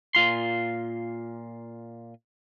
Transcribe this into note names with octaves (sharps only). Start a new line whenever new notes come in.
A#2 F4 C6